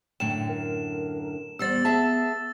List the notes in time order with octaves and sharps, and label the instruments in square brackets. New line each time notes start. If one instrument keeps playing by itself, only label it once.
[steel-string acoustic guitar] F#2 A2 D3 [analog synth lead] G5 [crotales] E7
[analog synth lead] A#4
[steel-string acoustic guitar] E2 G3 C5 [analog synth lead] B3 [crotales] E6 A6
[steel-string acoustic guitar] G#4 E5 A5